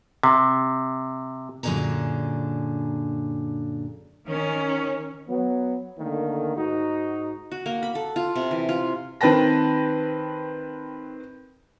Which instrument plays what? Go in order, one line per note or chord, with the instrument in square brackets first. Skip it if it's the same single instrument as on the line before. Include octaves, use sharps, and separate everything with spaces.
[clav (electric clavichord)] C3
[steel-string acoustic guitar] F#2 A#2 D3 D4 G#4 A#5
[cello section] D#3 C#4
[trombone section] F#3 B3
D3 D#3 A3 A#3
G#2 D#4 F#4
[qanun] F#4
A#3
B5
A4
F4
C3
E3
F4
[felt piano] D#3 C4 B4 G5 A5 A#6